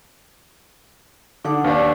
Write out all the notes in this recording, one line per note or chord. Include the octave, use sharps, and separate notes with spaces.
D3 D#4 F#5 D6
D#2 D4 B4